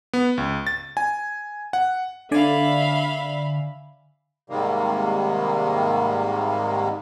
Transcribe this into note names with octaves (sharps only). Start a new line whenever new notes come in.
B3
C#2
A6
G#5
F#5
D3 D5 E5 F5 G#5 B5
G#2 C3 D#3 G3 A#3